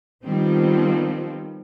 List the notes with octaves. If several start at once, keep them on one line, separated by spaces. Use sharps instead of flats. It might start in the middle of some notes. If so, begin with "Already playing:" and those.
D#3 F3 G3 B3 C4